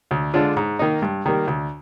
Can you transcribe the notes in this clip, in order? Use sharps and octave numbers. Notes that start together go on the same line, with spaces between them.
D2
D3 G#3 D4 F4
G#2
D#3 A#3 D#4
G2
D#3 G3 A#3
D2